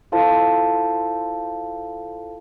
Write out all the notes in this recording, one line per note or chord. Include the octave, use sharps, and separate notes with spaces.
E4 F4 A4 C5 F5 A5